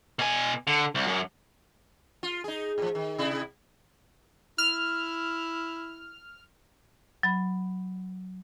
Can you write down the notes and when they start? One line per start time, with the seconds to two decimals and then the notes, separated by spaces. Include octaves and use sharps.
0.19 B2 G#5
0.67 D3
0.95 C2
1.07 F#2
2.23 F4
2.44 D#4 G#4
2.78 A2 F3
2.95 D#3
3.18 C3 E4
4.58 E4 F6
7.23 F#3 B5